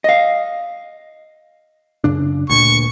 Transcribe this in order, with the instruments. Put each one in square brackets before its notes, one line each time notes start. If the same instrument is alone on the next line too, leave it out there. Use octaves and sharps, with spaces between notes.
[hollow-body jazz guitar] D#5 F5
[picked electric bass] F#2 C#3 D4
[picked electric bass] D2 A#2 [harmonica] C#6